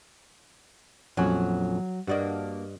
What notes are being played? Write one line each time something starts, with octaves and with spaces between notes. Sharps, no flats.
A#1 F2 F#3 C#4
G2 A#3 D4 F#4 D#5